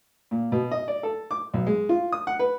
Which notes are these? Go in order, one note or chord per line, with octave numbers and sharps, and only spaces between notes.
A#2
B2
D#5
D5
A4
D6
B1
G#3
F4
D#6
F#5
B4